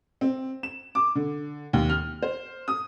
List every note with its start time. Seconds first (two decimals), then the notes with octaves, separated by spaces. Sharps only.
0.21 C4
0.63 E7
0.95 D6
1.15 D3
1.73 D#2
1.90 F6
2.22 C5
2.68 D#6